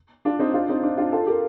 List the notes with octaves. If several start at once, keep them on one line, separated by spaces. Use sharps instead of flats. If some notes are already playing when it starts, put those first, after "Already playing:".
D4 F4
C4 D#4
D4 F4
C4 D#4
D4
D4 F4
F4 A4
G4 A#4